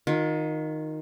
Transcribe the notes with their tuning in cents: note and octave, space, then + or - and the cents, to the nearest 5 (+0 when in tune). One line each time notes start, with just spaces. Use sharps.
D#3 +0 F4 +40